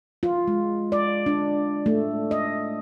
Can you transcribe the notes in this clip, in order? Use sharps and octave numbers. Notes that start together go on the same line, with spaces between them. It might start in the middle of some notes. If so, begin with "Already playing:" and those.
F4
G#3
D5
D4
A3
D#5